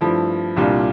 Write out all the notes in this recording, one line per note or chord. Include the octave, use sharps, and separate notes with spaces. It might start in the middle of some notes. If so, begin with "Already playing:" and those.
G2 F3 A3 E4
C2 A#2 G3 D4 F4